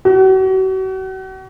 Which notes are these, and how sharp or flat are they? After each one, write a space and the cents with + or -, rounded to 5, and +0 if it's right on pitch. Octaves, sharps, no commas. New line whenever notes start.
F#4 +40